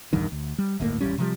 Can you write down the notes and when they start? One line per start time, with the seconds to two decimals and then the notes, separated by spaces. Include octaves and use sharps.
0.13 A#1 E2 G2 D#3
0.32 D2
0.58 G3
0.80 D1 G1 A2 A#3
1.00 D#1 A1 G3 C#4
1.18 C3 F3 G3